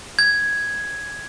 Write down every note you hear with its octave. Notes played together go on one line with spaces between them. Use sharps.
G#6